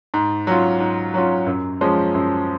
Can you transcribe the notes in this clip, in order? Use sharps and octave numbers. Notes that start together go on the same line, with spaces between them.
G#2
F#3 C#4 F4
G#2
F#3 C#4 F4
F#2
F3 G#3 C#4
F#2